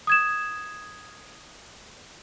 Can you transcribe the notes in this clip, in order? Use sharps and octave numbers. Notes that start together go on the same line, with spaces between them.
D#6 G#6 E7